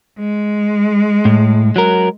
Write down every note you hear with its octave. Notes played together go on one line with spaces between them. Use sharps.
G#3
A2
F#3 A#4